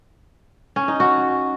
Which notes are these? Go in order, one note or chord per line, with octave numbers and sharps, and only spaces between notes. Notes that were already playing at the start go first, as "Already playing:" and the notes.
C#4
D#4
F#4